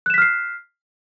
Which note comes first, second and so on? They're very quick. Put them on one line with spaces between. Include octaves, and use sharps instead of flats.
F#6 E7 B6 F6 C7